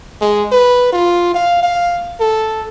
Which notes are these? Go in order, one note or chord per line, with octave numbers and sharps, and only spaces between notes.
G#3
B4
F4
F5
F5
A4